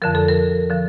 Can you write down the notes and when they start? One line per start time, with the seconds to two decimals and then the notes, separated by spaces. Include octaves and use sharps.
0.02 F2 D3 F3 A#4
0.15 A4
0.28 A#4
0.70 D3 F3